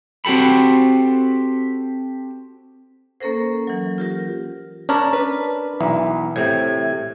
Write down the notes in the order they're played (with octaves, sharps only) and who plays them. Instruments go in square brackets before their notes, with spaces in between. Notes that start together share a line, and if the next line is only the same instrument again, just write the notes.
[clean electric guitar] C4 F#4 G4 A4 B5
[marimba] A#3 C#4 A4 A#4 C5
E3 F#3
F4 G4 A#4
[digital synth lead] C#4 [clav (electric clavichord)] D4 A#4 A5
[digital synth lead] B4
[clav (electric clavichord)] B1 [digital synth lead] E3
[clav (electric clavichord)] A2 C3 [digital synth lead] G#6